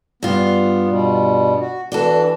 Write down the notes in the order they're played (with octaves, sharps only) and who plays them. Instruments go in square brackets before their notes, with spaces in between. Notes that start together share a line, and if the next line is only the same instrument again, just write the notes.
[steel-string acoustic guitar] G2 F4 [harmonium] B3
[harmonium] B2 G3
F#4
[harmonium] E3 [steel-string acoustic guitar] D4 F#4 A4